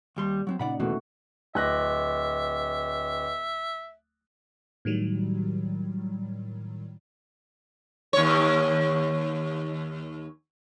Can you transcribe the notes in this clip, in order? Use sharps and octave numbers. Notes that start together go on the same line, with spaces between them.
D#2 G3 C6
F#3 B3 C4
A#2 C#3 D#4 D5 F#5 B5
E2 B2 E3 A3 F#4
D1 B4 D#5 E5 D6 F#6 A#6
A2 D#3 F#3 G3
D#2 C#5